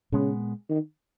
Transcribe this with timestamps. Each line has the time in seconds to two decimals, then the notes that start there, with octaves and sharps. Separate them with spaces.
0.12 A#2 C#3 G#3 B3
0.70 D#3